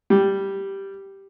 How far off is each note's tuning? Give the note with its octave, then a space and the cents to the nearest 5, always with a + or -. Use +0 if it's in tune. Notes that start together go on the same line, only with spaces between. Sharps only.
G3 -5